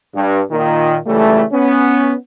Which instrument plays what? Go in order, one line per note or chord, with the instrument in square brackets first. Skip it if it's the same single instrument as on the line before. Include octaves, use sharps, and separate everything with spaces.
[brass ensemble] G2
A#2 D#3
C#2 C#3 E3 G3 A3
B3 C#4